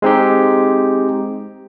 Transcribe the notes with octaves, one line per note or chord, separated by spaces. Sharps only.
G#3 C4 D#4 G4